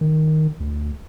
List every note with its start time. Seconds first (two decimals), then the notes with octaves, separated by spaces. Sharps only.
0.01 D#3
0.60 D2